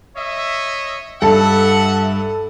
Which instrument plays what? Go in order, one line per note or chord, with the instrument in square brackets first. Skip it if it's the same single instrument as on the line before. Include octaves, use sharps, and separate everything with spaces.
[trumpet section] C#5 D#5 E5
[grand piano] G2 [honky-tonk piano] A4 [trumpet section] E5 F#5